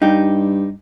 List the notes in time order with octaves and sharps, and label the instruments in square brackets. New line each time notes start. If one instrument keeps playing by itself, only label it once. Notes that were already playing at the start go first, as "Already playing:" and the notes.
[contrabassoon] G2 [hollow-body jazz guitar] D#4 G4